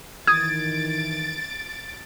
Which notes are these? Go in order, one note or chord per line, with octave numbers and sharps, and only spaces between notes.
D#3 E3 D#6 G#6 A6 D7